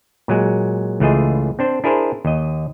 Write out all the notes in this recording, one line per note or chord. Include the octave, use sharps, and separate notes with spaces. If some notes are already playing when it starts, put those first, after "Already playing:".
A#2 F#3 G#3
C#2 E3 A3 F4 G#4 D#5
C4 D4 C5
D4 E4 G#4 A#4 C5
D#2 D#5